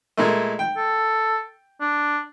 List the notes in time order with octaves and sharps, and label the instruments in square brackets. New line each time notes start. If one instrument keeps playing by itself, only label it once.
[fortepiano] A#2 G#3 A3
G5
[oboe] A4
D4